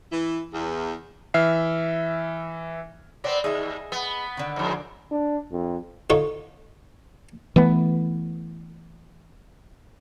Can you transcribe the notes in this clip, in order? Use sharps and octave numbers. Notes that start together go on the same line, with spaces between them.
E3
E2
E3 E5 F6 C7
B3 C4 D4 A#4 D5
D#2 G#4 D#5 E5
B3
D3 D#3
F2 G#2
D4
F2
D3 D#4 F4 A4 C#5 C#6
E3 A3 B3